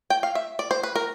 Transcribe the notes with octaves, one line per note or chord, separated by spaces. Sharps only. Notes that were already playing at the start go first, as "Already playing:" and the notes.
G5
F5
E5
D5
C5
B4
A#4